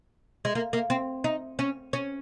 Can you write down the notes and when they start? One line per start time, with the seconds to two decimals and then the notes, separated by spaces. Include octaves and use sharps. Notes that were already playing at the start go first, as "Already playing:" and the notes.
0.45 G#3
0.55 A#3
0.73 A#3
0.90 C4
1.24 D#4
1.59 C#4
1.93 C#4